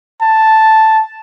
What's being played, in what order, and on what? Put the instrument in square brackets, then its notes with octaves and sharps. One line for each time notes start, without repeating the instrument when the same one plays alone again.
[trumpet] A5